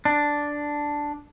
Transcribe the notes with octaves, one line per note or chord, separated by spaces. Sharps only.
D4